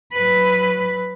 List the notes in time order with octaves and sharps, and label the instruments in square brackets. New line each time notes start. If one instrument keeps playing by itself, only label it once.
[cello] F#3 B4